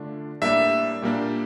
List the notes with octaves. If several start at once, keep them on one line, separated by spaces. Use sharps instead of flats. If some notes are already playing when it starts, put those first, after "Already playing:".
Already playing: D3 A3 D4 F4
A2 G3 A#3 D4 E5
A#2 G3 A#3 D4